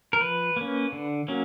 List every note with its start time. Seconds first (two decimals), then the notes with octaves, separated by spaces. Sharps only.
0.13 A#4
0.21 F3 B4
0.57 A#3 C#4
0.92 D3
1.28 F#3 A#3 C#4